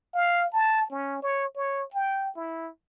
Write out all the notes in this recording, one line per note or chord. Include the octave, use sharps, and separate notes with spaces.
F5
A5
C#4
C#5
C#5
G5
E4